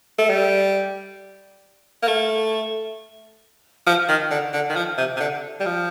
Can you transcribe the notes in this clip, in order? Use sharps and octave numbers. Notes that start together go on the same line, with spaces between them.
A3
G3
A#3
A3
F3
D#3
D3
D3
D#3
F3
C3
C3
D3
G3
F3